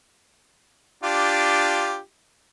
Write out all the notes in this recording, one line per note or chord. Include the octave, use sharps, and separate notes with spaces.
D4 F4 G4